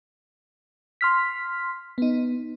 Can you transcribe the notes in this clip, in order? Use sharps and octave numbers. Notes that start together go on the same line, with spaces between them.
C6 F6 B6
B3 D#4